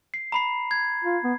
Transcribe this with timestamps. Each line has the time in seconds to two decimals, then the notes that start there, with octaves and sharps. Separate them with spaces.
0.14 C7
0.32 A#5 B5 C7
0.71 G#6
1.04 F4
1.24 B3